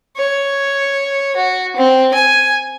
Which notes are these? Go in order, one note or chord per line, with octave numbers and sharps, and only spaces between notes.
C#5
F#4
C4
G#5